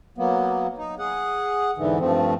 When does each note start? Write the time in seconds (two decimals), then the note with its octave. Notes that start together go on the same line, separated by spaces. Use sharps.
0.18 F#3 A#3 B3
0.78 D#4
0.99 G#4 F#5
1.77 E2 G#2 D3 E3
2.00 G2 F3 A3 C4